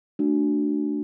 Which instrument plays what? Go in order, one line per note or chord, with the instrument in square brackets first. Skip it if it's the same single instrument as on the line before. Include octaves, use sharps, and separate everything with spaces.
[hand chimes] A3 D4 F#4